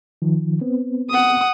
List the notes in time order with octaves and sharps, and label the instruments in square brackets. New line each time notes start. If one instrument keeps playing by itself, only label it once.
[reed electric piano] D#3 F3
B3 C4
[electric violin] F#5 D#6